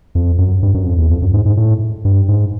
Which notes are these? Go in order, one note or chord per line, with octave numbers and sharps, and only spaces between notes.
F2
F#2
G2
F#2
F2
E2
F2
F#2
G#2
G#2
A2
G2
G#2